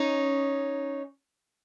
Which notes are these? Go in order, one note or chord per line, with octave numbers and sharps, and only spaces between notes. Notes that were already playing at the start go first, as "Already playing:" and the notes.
Already playing: C#4 D#4